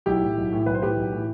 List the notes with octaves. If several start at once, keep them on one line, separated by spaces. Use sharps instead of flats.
B1 E4 G4
A2 E3
B1
A2 E3
B1 B4
C5
A2 E3 G4 B4
B1
A2 E3